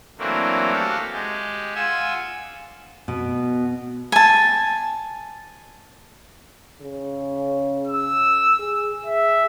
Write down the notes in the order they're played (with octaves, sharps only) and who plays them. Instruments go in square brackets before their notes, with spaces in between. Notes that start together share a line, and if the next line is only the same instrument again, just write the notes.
[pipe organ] E3 F#3 A3 A#3 C4 D4
F#4 G4 A4 F5
G#3 G4
F4 F#5 G#5 E6
[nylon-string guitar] B2
[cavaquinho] G#5 A5
[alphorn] C#3
[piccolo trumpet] E6
[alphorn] G#4
[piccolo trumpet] E5